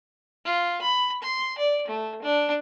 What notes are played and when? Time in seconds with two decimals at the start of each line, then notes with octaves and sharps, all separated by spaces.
0.45 F4
0.82 B5
1.22 C6
1.58 D5
1.88 A3
2.22 D4